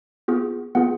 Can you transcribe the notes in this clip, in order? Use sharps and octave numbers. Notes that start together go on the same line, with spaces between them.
B3 F4 G#4
B3 F4 G#4 F#5